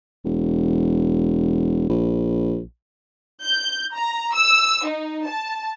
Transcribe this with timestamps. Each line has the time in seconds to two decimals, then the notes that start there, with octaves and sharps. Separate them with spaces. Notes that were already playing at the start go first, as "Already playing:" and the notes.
0.25 E1
1.89 A#1
3.43 G6
3.95 A#5
4.35 E6
4.87 D#4
5.27 A5